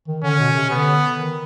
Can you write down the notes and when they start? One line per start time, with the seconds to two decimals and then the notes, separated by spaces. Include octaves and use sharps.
0.08 D#3
0.23 D3 C#4
0.39 B2
0.55 C3
0.70 D3 B3
1.18 D#3